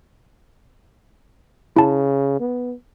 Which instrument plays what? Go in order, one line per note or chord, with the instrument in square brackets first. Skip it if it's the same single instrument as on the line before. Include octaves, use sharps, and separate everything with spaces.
[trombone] C#3 [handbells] E4 A5
[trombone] B3